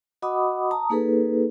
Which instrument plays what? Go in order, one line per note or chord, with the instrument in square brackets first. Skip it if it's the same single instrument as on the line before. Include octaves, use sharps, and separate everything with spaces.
[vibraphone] F#4 D#5 F#5 B5 D6 D#6
A5 A#5 D#6
A#3 D#4 G#4 A4 B4